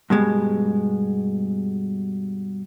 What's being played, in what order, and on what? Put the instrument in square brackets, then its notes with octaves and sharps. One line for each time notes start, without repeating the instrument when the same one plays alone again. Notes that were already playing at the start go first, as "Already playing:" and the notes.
[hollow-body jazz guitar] G2 B2 G#3